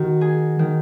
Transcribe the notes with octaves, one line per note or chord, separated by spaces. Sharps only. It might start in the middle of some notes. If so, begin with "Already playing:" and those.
Already playing: D#3 F#4
G#4
D#3